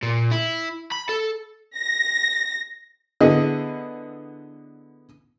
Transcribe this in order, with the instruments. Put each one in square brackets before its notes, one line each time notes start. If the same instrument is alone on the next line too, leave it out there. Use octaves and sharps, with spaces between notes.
[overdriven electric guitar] A#2
E4
B5
A4
[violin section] A#6
[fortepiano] D3 B3 E4 G#4 D#5